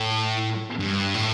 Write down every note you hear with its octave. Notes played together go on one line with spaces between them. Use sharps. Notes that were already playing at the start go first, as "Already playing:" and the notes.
Already playing: A2
G2
A2